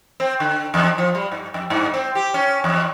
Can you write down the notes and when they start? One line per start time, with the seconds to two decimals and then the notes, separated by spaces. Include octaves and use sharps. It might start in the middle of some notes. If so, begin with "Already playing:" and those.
0.20 C4
0.40 D3
0.74 E2
0.98 F3
1.15 G3
1.32 G2
1.54 F2
1.70 G2
1.94 C4
2.15 G4
2.34 C#4
2.64 E2